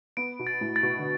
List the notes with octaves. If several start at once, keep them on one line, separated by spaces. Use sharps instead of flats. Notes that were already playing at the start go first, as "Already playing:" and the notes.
B3 D7
B2
A6
A2
A6
B2
D3